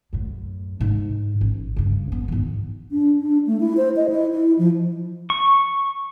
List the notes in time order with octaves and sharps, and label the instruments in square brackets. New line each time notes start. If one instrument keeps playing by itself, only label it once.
[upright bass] F#2 A2
G#2 D3
A1
G2 C#3
B3
G#2 D#3
[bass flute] D4
D4
A3
E4
C5
D#5
E4
E4
F3
[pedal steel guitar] C#6